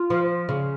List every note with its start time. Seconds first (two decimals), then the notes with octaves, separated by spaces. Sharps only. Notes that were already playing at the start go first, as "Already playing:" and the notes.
Already playing: F4
0.10 F3
0.49 C#3